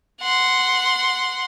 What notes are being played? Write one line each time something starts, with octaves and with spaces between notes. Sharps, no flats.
F#5 C6